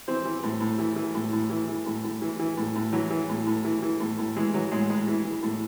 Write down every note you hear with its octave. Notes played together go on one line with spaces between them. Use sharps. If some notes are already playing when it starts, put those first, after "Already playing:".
E3 C4
E3
A2
A2
E3
E3
A2
A2
E3
E3
A2
A2
E3
E3
A2
A2
E3 F#3
E3
A2
A2
E3
E3
A2
A2
E3 G#3
E3 F#3
A2 G#3
A2 G#3
E3
E3
A2